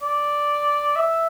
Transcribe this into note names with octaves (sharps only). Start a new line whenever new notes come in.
D5
E5